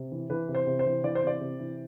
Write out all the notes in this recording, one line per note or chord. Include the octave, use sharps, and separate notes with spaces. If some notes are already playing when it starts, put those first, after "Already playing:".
Already playing: C3
E3
E3 B4
C3
C5
C3
C5
E3
E3 D5
C5
C3 D5
C3
E3